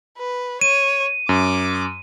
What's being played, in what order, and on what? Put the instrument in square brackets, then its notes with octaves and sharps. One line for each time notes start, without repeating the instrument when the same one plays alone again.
[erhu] B4
[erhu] C#5 [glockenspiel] D#7
[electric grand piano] F#2 [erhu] D6